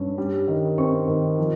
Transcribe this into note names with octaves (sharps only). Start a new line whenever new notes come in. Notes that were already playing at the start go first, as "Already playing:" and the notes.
Already playing: G2 C#4
G3
D#3
C4 C#6
D#3
F3